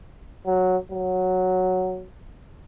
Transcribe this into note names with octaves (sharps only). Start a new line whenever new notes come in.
F#3
F#3